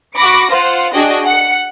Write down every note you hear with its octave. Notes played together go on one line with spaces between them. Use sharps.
F#4 B5 D6 A#6 C#7 D7
F4 C5 F#5
D4 F#4 G#4 D#5 G5
F#5 C#7